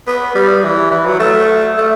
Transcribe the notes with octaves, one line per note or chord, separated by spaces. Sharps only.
B3
G3
E3
E3
F#3
A3
A3